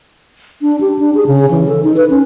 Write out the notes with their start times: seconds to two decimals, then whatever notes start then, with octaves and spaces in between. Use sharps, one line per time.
0.62 D4
0.81 G4
0.99 D4
1.15 G#4
1.27 C#3
1.51 E3
1.68 A4
1.83 D#4
1.97 B4
2.10 C#4